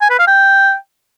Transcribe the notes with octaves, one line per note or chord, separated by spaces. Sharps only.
G#5
B4
F5
G5